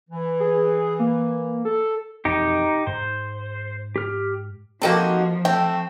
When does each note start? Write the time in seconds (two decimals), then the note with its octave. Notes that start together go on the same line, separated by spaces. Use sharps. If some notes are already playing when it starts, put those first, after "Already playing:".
0.09 E3
0.40 G#4
0.99 A#3
1.65 A4
2.25 E1 F2 C4 D#4 G4
2.87 G#2 C5
3.96 G4 F6
4.82 F3 A#3 C4 D#4 F#4 G4 A4
5.45 A3 C4 G5